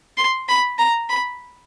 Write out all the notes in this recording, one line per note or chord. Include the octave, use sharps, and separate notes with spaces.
C6
B5
A#5
B5